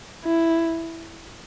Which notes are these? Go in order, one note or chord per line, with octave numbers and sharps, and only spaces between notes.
E4